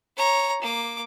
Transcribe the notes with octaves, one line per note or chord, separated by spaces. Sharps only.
C#5 A#5
A#3 D6